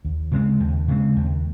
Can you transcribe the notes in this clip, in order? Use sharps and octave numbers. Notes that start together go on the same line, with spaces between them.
D#2
C#3 G#3 C4
D#2
C#3 G#3 C4
D#2